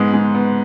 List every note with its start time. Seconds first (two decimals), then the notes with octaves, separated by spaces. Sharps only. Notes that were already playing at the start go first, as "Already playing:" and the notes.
Already playing: G#2 G#3 B3
0.14 G#3
0.35 B3